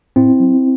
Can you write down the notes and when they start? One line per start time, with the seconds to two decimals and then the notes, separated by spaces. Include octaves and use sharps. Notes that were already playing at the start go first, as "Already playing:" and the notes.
0.16 A2 C4 E4
0.40 F#3